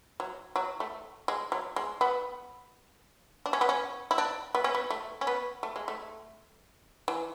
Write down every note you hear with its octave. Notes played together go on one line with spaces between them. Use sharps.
F#3
F#3
A3
G#3
F#3
G#3
B3
D4
C#4
B3
C#4
E4
D4
B3
C#4
B3
A3
C#4
B3
A3
G#3
A3
E3